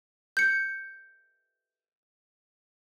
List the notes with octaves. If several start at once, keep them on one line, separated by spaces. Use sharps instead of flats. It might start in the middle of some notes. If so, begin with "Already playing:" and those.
G6 C#7